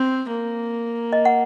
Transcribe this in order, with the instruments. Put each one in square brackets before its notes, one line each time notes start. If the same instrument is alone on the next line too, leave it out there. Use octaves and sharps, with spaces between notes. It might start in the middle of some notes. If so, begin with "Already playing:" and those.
Already playing: [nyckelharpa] C4
A#3
[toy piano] D#5
F#5